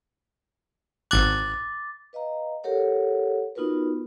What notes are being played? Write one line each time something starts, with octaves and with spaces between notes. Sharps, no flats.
G#1 D6 F#6 A6
B4 D#5 F5 A#5
G4 A4 A#4 C#5 F#5
B3 D#4 F4 F#4 A#4 B4